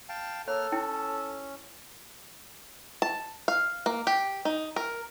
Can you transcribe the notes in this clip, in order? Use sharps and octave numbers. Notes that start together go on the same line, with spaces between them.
F5 G5 A5
A#3 A4 C#5 F6
C#4 E4 G5
A5
F5
A#3
G4
D#4
A#4